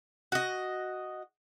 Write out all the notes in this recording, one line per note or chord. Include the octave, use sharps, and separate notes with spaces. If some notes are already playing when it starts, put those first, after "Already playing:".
F#4 D#5